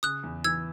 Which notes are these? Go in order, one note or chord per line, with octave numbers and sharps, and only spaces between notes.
C#3 D#6 F#6
E2
E3 E6 G#6